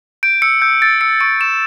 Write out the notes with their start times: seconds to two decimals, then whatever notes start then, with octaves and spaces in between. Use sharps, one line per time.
0.23 G6 D7
0.42 E6 C#7
0.62 E6 G6
0.82 E6 A6
1.01 E6 C#7
1.21 C#6 D7
1.40 C#6 E7